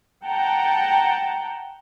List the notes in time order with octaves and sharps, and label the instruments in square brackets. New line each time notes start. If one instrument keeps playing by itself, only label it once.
[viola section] F#5 G5 A5 A#5